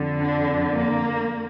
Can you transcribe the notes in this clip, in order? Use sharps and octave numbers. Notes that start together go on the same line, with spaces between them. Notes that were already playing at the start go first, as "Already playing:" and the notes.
Already playing: F2 D3
D4
A#3